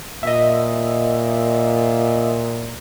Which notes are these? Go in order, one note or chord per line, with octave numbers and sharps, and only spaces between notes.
A#2 D#5 E5